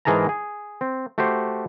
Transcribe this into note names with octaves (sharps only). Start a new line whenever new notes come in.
G#2 E3 G#4 A#4 A5 A#5
G#4
C4
A3 F#4 G4 C5